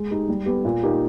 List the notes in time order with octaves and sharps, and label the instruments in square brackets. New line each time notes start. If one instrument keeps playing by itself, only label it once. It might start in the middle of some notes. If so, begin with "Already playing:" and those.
Already playing: [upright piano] G#3
D#4 G4
G3
B3 G4
A#2
A#3 D#4 G4